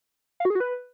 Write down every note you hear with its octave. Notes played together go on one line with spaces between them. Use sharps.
F5
F#4
G#4
F#4
B4